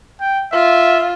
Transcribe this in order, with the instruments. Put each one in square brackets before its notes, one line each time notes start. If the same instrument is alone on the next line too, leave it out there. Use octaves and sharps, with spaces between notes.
[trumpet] G5
[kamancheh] F4 [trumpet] E5